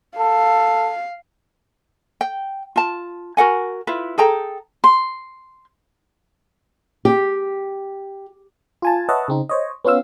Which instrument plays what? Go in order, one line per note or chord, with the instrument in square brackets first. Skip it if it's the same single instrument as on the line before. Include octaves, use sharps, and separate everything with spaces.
[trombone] A4 [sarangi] F5
[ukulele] G5
F4 A5
F#4 A#4 F#5 G#5
E4 F4 B4
G#4 A4 G5 A#5
[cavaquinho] C6
[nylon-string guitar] G4
[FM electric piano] F4 G#5 A5
B4 C#5 D#5 E5 F#5 A5
C#3 C4 D#4
C5 C#5 D#5
B3 C#4 F4 F5 E6